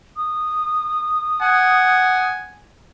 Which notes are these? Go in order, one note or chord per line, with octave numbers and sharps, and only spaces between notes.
D#6
F#5 G#5